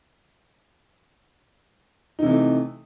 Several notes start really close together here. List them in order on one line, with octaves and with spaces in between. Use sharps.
D#4 C3 E3 A3